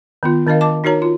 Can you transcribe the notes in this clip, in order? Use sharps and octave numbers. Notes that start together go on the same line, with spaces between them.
D#3 B3 F4
D#3 D4 A#4 D#5 F5
D#5 A5 D6
D#4 F#4 A#4 C#5 A#5
F4